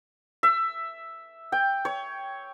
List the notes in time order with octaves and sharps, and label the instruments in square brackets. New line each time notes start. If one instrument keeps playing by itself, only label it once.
[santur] E5
G5
C#5